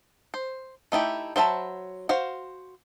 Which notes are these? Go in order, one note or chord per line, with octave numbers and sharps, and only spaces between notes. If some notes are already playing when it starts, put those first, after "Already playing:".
C5
A3 D#4 E4 G4
F#3 C5 E5 A5 B5
F#4 C5 F5